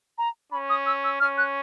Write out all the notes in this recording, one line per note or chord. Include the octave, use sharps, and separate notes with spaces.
A#5
C#4 B5
D#6
E6
E6
C#4 F6
F#6